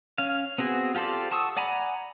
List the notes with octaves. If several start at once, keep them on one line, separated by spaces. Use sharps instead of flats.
C#4 F5
B3 C4 F#4 G#4
F4 G4 A4 C5 D5
F#5 A5 C#6 D#6 E6
D5 F#5 G#5 A#5 B5